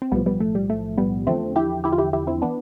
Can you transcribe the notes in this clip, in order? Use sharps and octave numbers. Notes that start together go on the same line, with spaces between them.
C4
B1 A2 F3 G3 B3
G3 B3
A3
G3
A3
G3 B3
E2 D3 F3 A3 C4
E4 G4
E4 G4
F4
E4 G4
E4 G4
C4 E4
E3 B3 D4